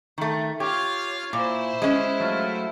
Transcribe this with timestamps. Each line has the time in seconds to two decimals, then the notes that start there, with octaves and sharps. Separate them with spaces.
0.18 D#3 A3
0.60 F4 G4 C#5 F5
1.33 A#2 E4 C5
1.82 G#3 C#4
2.20 F#3 A3 F4